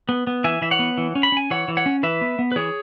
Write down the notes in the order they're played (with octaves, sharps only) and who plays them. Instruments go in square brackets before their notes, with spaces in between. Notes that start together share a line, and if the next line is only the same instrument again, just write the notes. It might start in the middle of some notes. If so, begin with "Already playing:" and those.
[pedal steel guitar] B3
B3
E3 E5 G#5
E3 E5
C#5 F#5
B3
E3
C#4
B5
C#4 G#5
E3 C#5 F#5
E3
C#5 F#5
C#4
E3 B4 E5
B3
B3
B4
E3 G#4 C#5